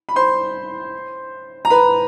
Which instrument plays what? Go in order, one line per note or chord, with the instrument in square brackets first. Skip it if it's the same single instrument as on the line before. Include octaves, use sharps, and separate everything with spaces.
[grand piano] B5
C5 C6
A#5
B4 B5